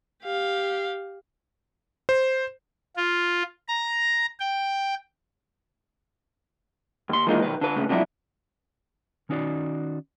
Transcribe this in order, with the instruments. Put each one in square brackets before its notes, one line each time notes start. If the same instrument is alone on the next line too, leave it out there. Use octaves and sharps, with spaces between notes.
[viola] G4 F5
[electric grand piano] C5
[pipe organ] F4
A#5
G5
[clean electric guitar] D#2 C6
D#3 E3 G#3 A#3 D#4 F4
B1 A#2 D#3 B4
D3 B4
C2 A2 C#3 C#4 B4
C3 F3 F#3 D4 E4
D#3 C#4 D#4 F#4 D5